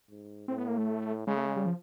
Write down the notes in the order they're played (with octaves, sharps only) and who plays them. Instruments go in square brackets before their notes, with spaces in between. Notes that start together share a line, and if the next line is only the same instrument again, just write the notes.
[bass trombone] G#2
[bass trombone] A2 [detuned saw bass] C4
[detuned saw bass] B3
A#3
A3
[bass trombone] C#3 [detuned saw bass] G#3
[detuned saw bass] A3
G#3
G3
F3